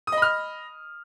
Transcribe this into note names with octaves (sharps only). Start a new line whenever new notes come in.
D#5 B5 D#6 F6